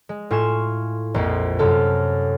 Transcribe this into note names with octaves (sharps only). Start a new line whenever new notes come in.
G#3
A2 F4 G#5 C#6 G#6 E7
A#1 F2
F#2 C3 A4 F6